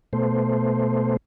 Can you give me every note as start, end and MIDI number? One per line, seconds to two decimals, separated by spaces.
0.13 1.17 47
0.13 1.17 57
0.13 1.17 72